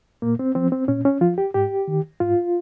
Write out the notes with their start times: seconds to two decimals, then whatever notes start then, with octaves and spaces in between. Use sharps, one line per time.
0.22 A#2 A#3
0.39 C4
0.55 F3 C4
0.72 C4
0.88 A#2 C#4
1.05 C#4
1.21 F3 F4
1.38 G4
1.54 G#2 G4
1.88 D#3
2.20 G#2 F4